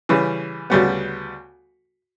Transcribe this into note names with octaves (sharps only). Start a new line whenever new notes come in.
C#3 E3 G3
D2 C#3 G3 B3